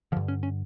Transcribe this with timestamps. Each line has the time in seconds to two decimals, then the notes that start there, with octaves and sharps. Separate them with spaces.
0.12 D3 F3
0.17 G2
0.28 C#4
0.43 C#4